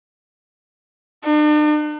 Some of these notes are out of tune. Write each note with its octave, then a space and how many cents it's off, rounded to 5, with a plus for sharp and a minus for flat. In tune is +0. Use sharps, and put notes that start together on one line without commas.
D4 +45